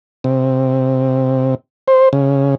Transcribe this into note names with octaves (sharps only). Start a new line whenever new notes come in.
C3
C5
C#3